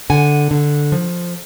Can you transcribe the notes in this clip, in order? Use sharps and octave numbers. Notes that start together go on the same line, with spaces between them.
D3 F#5 G#5
D3
F3